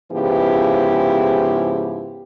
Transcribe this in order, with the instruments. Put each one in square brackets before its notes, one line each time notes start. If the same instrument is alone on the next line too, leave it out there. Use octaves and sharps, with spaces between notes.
[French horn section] G#2 C#3 F3 B3 E4 G4